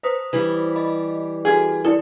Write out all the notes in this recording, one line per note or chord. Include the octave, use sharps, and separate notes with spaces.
B4 C5 D#6
E3 G3
D#5 B5
F#4 G#4 A4
E4 A4 D5